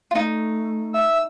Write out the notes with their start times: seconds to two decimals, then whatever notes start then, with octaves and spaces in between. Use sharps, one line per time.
0.11 A3 D#4 F4
0.94 E5 E6